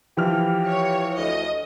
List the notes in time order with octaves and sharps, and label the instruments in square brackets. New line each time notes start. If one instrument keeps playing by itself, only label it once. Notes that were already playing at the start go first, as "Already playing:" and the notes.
[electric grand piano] E3 F3 F6 [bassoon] G4
[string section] C#5
[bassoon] D2 [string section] D#5